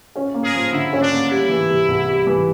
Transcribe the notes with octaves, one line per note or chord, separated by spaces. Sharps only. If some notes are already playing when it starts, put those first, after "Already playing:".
C#4
A#3
G#4 A#4
F3
D3 E4
C#4
D4
A#3
G3 E4
E3
C3
C2
G3
E3